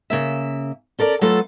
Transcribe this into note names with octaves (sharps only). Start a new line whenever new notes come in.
C#3 A#3 E5
C#4 A4 A#4 D5
F#3 A3 B3 F4 A4